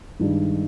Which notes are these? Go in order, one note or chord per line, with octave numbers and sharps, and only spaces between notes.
G2 D#3 G#3 D4